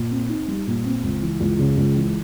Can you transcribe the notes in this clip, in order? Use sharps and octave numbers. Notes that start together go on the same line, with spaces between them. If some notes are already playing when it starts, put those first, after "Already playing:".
Already playing: A#2
C4
D#4
G3
A#2
C4
C#2
E3
C#2
C#3
C#2
E3